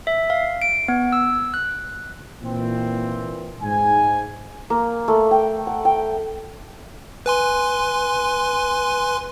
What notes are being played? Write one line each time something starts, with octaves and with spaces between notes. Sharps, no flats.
E5
F5
D7
B3
E6
F#6
A#2 E3 C4
G#2 G#5
A#3
A3
G5
F#5
G5
B4 G#5 C6